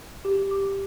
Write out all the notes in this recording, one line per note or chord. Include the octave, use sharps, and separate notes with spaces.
G4
D6